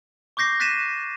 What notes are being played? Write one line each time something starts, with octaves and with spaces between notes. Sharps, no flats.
C#6 D6 G6 A#6 C7
F#6 A6 B6 C7 D#7 E7